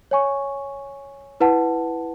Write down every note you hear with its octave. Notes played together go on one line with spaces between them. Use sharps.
C#5 G#5 C#6
E4 B4 F#5 A5